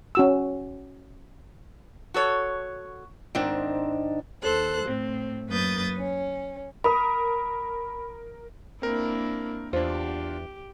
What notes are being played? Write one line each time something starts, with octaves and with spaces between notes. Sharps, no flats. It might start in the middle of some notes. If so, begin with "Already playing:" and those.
C#4 F#4 E6
F#4 A4 C#5
G#2 D#3 C4 D4
D#2 A4 C5 F#6
A2 C4
F#2 A#3 B4 D#6 G6 A6
C#4
A#4 B5 D#6
A#3 C4 D4 E4 A#4
E2 D4 F4 G4 C5